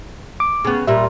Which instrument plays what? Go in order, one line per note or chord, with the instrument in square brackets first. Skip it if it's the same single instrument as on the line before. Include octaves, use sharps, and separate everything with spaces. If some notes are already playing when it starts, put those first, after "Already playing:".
[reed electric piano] D6
[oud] C#3 B3
[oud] A#2 G3 [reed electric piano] E5